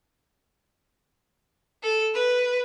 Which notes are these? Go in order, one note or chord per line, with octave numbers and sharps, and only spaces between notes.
A4
B4